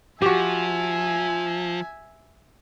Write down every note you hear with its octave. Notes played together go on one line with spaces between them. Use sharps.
F3 F#4 G4 E5 G#5